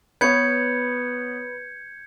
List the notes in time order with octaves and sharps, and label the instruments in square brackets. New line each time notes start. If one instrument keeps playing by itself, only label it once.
[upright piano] B3 C#5 [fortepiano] B4 [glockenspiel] G6 G#6 C#7